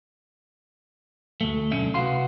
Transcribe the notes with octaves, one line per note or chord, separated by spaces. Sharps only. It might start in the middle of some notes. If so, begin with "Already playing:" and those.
D2 A3
B1 D3 F3 C#4 E5
C2 F2 B3 F#4 F5 C6